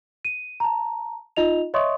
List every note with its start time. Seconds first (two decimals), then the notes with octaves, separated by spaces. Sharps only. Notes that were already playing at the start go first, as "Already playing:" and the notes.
0.25 D#7
0.60 A5 A#5
1.37 D#4 F4 D#5 F7
1.74 C#5 D#5 E5 C6 C#6 D#6